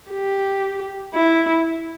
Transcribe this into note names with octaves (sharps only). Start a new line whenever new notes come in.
G4
E4